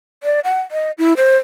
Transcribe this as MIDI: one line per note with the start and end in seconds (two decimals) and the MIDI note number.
0.23 0.40 74
0.44 0.61 78
0.71 0.91 75
0.98 1.13 64
1.17 1.37 72